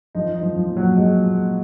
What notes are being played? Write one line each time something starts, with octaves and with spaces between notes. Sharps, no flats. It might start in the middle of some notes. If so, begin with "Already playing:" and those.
F3 D#4
D#4
F3
F3
A#2
F#3
A#2 G#3
A#2